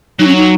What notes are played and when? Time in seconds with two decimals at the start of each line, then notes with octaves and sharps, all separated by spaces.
0.19 F#3 D#4
0.27 C#4
0.36 D#4